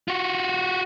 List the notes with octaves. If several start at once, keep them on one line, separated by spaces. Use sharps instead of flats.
F4 F#4